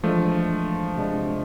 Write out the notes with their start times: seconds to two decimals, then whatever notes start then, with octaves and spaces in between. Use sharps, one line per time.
0.03 E3 F3 G#3 A3 D4
0.97 C3 G#3 D4